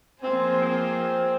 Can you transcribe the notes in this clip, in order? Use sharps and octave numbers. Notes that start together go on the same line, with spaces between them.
F3 A#3 C4 F4 G#4 C5
C4